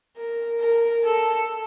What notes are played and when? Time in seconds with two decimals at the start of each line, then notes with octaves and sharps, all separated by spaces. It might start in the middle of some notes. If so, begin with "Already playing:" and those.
0.17 A#4
0.61 A#4
1.04 A4